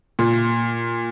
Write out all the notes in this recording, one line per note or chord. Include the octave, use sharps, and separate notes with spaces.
A#2